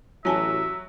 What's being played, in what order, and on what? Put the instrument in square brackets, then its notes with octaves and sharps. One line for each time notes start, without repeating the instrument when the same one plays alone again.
[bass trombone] A1 [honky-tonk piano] F#3 [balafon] C#5 G#5 A5 [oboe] E5